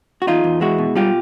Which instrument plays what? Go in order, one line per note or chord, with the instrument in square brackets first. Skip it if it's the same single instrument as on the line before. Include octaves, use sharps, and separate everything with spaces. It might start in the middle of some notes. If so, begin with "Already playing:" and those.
[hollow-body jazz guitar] F#4
E2 D#4 F4
E2
G#3 E4 F#4
B2
G3 F4 G4